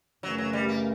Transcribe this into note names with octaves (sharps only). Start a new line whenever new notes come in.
F#2 C#3 E3 F#3 A3
F#3
G3
A#3